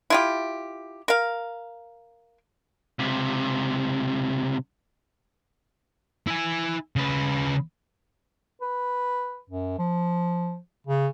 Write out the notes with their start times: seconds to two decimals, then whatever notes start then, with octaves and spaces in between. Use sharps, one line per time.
0.10 E4 F4 G4
1.08 A#4 F5
2.99 C#2 C3
6.27 E4 G#5
6.96 C#3 B4
8.61 B4
9.50 F#2
9.78 F3
10.87 C#3